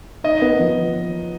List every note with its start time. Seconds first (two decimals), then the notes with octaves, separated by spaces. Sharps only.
0.24 D#4 D#5
0.42 B3
0.59 F3